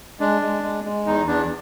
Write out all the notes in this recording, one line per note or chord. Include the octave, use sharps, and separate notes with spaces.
G#3 D4
G#3
G#3
G#3
E2 D#4
E2 D4